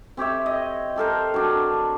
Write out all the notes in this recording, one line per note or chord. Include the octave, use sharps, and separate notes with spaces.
C4 G4 C#5 E5
D#5
G4 A4 A#4 C5
F#3 D4